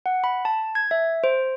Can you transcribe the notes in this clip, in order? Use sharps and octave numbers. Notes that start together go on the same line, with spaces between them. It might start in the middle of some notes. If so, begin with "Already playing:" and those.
F#5
B5
A5
G#6
E5
C5